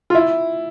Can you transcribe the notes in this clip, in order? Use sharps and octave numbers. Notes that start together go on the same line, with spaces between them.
F4
E4